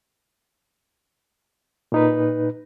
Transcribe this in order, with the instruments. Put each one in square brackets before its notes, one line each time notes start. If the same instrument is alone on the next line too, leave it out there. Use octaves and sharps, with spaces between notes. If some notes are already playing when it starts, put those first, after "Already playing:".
[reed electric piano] A#2 D#4 B4